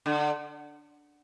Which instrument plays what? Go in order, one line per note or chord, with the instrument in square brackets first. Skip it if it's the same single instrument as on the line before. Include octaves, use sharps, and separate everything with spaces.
[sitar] D3